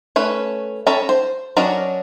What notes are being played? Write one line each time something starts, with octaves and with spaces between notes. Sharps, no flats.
A3 C#4 B4
C#4 A4 C#5 A#5 B5
C5
F#3 C#4 D4 A#4 D#5